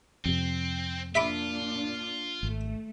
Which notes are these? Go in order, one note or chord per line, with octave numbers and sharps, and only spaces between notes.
F2 C3 C4
A#2 D4 F4 E5 B5 D6
G#1 A3